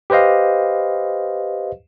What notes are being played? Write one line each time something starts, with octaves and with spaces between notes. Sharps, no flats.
G4 B4 C5 D#5 F5